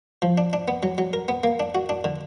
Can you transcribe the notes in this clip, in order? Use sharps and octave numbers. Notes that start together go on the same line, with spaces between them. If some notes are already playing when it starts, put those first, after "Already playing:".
F3
D4
D4
B3
F#3
F#3
A#4
B3
A#3
D4
F#4
D4
D3